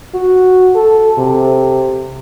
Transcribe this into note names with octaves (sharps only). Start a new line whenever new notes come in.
F#4
A4
C3